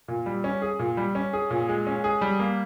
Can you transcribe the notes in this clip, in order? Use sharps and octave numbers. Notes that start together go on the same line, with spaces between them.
A#2
G3
C#4
G#4
A#2
G3
C#4
G#4
A#2
G#3
C#4
G#4
G3
A#3